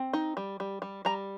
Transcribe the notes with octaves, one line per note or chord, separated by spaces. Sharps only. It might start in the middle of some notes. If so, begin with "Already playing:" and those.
Already playing: C4
D#4
G3
G3
G3
G3 A#5